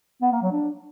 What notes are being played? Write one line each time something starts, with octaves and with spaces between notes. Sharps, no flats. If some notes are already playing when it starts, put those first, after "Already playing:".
B3
A#3
F#3
D4